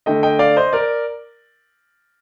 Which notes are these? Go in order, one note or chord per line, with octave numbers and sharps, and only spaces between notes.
D3 A3 D#5 G5
D#5 G5
D5 F5
C5 D#5
A#4 D5